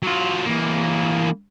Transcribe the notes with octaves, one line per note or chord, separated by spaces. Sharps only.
F#3 F4
E3 A#3